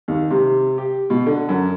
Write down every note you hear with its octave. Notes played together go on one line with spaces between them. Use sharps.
D#2
C3
G4
B2
D3
F#2